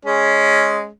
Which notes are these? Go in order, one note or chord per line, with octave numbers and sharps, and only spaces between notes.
G#3 C#4